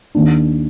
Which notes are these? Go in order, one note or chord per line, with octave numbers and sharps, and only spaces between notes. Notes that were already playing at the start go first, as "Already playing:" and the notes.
D#2 D#3 A#3 D4